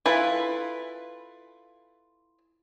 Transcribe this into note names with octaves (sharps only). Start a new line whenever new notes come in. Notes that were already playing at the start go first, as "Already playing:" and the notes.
E4 F4 A4 B4